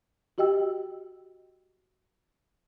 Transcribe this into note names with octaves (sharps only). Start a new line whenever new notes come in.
F#4 G4 D#5 G5 E6